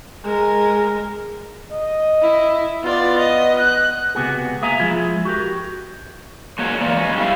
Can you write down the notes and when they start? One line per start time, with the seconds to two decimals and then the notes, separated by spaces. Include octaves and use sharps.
0.24 G#3 A#4
1.71 D#5
2.22 E4
2.84 B3 F4 D5
3.18 D#5
3.59 F#6
4.15 C#2 C3 B3 F#4 G#4
4.62 A#3 G#4 E5 F5 G#5 A#5
4.80 F3 G#3 E4 F4 G#4
5.25 F#4 G4 A#4
6.59 G#3 A#3 F#4 G#4 C#5
6.81 E3 A#3 D5
6.97 G#3 C#4
7.15 G3 A3 A#3 E4 F5